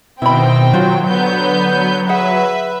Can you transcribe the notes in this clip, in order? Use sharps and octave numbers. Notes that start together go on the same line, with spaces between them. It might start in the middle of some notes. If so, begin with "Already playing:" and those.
B2 D#3 C4 E4 G5 B5
F#3 F4 F#4 C5
D3 B3 G6
G#4 B4 E5 F#5